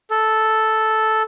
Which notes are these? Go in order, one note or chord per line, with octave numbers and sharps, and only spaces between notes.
A4